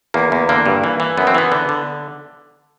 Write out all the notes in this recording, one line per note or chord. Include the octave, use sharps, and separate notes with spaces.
E2 A#3
E2
D3 A#3
G2
E3
E3
F#2 B3
C4
E3 B3
D3
D3